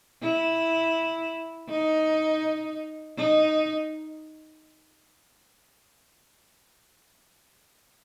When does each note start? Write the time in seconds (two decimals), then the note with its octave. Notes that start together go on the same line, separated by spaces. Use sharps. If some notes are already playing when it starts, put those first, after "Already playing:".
0.22 E4
1.70 D#4
3.17 D#4